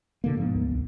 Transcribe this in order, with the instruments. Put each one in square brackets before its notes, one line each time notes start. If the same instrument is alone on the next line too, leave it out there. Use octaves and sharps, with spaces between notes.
[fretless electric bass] B2 D3 A#3
G#2 F3 B3
[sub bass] D2
[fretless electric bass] C2